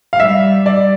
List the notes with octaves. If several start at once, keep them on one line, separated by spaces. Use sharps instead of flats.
F5
G3 E5
G3 D5